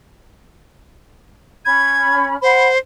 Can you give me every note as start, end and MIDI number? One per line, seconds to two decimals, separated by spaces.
1.65 2.35 61
1.65 2.35 83
1.65 2.27 92
2.42 2.77 72
2.42 2.67 78
2.42 2.67 83